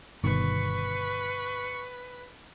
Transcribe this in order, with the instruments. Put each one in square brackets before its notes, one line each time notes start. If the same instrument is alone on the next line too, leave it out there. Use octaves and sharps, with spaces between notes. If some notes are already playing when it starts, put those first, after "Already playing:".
[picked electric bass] G1 D#3 [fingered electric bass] B2 [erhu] B4 [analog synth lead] C#6